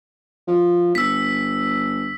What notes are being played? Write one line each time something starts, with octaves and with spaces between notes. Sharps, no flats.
F3
G1 E6 B6